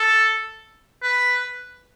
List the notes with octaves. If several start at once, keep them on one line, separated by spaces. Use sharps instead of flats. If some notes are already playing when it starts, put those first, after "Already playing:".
Already playing: A4
B4